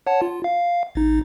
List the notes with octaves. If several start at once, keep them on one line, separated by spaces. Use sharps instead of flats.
C#5 F#5 A5
F4
F5
A1 D#4